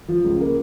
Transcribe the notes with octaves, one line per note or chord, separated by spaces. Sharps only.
F3
C#2
A#3